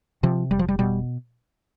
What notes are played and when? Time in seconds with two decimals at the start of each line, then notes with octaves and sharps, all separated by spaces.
0.23 C3 F3
0.51 F1 G3
0.59 F3
0.68 G3
0.79 B2 G3